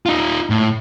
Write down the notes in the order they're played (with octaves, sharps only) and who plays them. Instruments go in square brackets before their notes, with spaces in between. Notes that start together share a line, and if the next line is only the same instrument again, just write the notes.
[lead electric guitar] D#4 F4
A2